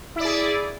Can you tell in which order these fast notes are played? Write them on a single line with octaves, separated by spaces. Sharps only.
E4 D5 G#4